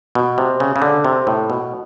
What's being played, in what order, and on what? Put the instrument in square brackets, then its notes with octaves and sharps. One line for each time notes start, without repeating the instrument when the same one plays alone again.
[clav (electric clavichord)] B2
C3
C#3
C#3
D3
C3
A2
B2